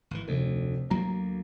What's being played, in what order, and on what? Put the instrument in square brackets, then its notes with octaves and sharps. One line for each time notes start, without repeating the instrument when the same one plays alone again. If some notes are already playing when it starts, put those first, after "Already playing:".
[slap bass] G#1 E3
[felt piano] F1 [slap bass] D2
[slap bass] D2 F#3 A#3 [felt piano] A#5